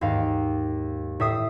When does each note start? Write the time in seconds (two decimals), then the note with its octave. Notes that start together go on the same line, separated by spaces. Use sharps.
0.01 D#2 G#2 F5
1.20 A2 E5 D#6 C7